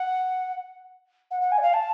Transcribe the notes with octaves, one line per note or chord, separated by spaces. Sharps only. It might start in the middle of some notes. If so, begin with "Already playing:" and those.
Already playing: F#5
F#5
F#5
G#5
D5
F5
A5